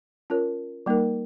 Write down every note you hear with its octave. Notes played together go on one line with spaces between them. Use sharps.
C#4 F4 A#4 C#5
G3 A#3 D#4 A#4